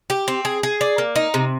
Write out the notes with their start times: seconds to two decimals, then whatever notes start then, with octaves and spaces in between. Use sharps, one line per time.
0.10 G4
0.28 C4
0.45 G#4
0.63 G#4
0.81 D5
0.98 A#3
1.16 D#4
1.34 C3